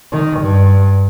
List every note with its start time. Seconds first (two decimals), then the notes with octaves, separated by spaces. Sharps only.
0.12 D#3
0.41 G2